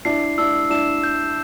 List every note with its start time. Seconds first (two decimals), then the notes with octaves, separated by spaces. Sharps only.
0.05 D4 E4 C7
0.38 D4 E4 E6
0.70 D4 E4 E7
1.03 G6